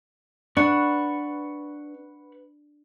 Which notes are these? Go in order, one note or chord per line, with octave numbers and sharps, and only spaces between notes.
D4 B4 F#5 C#6